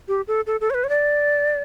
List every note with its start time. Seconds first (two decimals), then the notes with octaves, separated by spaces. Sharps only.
0.08 G4
0.28 A4
0.47 A4
0.61 A4
0.70 C#5
0.74 B4
0.84 C#5
0.89 D5